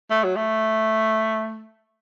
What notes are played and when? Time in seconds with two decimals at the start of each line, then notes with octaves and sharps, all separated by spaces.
0.10 A3
0.24 F#3
0.36 A3